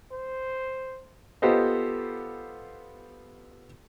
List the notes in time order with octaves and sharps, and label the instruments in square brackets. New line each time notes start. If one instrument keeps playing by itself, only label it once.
[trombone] C5
[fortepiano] B3 F4 G4 A4 C5 D#5